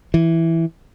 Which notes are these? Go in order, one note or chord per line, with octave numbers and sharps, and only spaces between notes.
E3